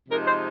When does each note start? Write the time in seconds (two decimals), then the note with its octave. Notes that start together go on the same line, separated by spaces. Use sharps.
0.09 C3 F3 G#3 D#4 A#4
0.26 C5